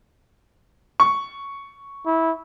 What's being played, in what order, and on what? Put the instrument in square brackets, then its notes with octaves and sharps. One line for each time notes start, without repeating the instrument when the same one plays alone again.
[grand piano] C#6
[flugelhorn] E4